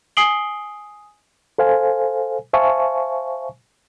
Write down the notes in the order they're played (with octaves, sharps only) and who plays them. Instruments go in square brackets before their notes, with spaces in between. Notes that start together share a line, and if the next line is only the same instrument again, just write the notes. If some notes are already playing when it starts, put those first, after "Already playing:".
[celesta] G#5 D#6 C7 D7 F#7 G7
[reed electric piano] A4 C5 F5 G#5
C5 E5 F5 G#5 A5 C#6